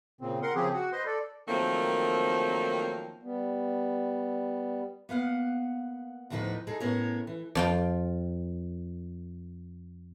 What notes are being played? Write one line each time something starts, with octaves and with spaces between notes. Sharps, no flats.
A#2 C#3 C4
A#4 F#5 C6
C#3 F3 C4 G4 G#4
F#4 F#5
B4 C5 D#5 C6
A4 D5
D#3 F3 F#3 A3 A#3 C4
G3 B3
A#3 B3 F5 F#5
D2 A2 D3 F3 D#4 B4
G#3 D#4 G#4 A4
A2 B3 C#4 A#4 C#5
E3
F2 F4 G5